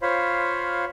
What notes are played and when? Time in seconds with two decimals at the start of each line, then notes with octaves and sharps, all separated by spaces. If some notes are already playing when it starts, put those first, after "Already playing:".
0.02 F4 C5 C#5 F5 B5